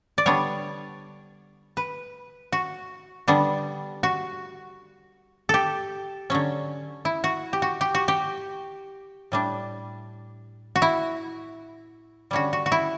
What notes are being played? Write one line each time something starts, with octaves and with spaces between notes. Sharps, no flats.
D5
D3 G3 B3 D4 C#5
B4
F#4
D3 G3 B3 D4
F#4
G4 A4
D3 F#3 C#4
E4
F#4
G4
F#4
G4
F#4
G4
A2 G3 D4
F#4
E4
D3 G3 C#4 F#4
F#4
F#4
E4